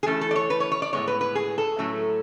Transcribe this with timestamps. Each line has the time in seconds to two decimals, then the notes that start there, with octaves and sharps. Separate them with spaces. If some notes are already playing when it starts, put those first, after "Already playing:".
0.03 G#4
0.06 E3 A3 C#4 A4
0.21 A4
0.31 D5
0.36 C#5
0.50 B4
0.60 C#5
0.72 C#5
0.82 D5
0.93 A2 G#3 B3 C#5
1.07 B4
1.21 B4
1.35 G#4
1.58 A4
1.78 A2 F#3 A3 C#4